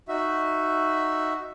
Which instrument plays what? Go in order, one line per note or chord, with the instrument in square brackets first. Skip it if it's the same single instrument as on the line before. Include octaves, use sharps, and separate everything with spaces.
[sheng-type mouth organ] D#4 F#4 E5